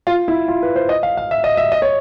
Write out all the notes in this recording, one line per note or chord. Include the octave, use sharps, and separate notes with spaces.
F4
E4
F4
B4
C5
D#5
F5
F5
E5
D#5
E5
D#5
C#5